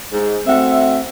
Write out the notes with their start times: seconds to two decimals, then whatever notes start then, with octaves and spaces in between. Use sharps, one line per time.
0.12 G#2
0.47 A3 C4 F#4 E5